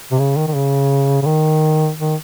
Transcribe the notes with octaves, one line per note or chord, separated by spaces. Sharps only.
C3
C#3
D#3
D#3
C#3
C#3
D#3
D#3